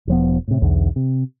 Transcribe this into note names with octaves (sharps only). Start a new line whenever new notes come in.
E1 F3 B3
A2 C3
B1 E2 D3
C3